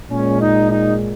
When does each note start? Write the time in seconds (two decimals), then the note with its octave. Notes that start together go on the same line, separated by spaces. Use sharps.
0.11 A#2 G#3 C#4
0.41 D#4
0.70 D#4